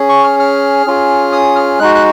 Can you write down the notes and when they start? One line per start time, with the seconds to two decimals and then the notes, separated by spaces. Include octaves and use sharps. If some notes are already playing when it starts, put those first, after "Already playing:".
Already playing: C#4 G#4
0.09 C#6
0.24 F6
0.40 F6
0.86 C#4 F4 G#4
1.33 D#6
1.56 F6
1.79 G#3 D#4 F#4 F#6
1.95 F#6